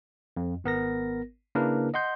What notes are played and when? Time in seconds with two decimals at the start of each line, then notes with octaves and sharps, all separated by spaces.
0.37 F2
0.64 G#1 B3 A#4 A#6
1.55 C#3 A#3 D4 E4 A#4 B4
1.94 D#5 F#5 C6 G6